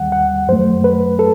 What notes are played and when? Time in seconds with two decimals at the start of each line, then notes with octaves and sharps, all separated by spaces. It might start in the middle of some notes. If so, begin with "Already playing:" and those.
Already playing: D#2 D#3 G3 F#5
0.12 F#5
0.48 F#2 F#3 A3 C5
0.84 B4
1.19 A4